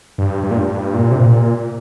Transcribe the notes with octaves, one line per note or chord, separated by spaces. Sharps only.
G2
G2
A#2
G2
G2
A#2
C3
A#2